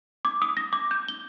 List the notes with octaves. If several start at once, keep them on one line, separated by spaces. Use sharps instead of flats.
D6
D#6
A#6
D6
G6
G7